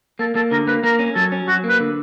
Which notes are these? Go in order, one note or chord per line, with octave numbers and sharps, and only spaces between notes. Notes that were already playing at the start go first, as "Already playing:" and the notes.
A#3 A4
A#3 A4
D3 A#4
A#3 B4
A#3 A#4
C#4
F#3 A4
C#4
F#3 F#4
A#3
B4
D3